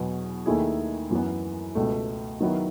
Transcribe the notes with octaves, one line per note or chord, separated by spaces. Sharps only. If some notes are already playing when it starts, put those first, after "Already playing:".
Already playing: E2 B2 F#3 B3
D#2 D#3 A3 E4 G#4
F#2 E3 B3
C#2 B2 A3
D#3 F#3 B3 E4